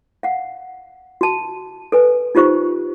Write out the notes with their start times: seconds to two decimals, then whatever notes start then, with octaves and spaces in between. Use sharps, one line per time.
0.23 F5 F#5
1.21 F#4 A5
1.92 A4 B4 G#5
2.35 D#4 F4 G4 C5 C#6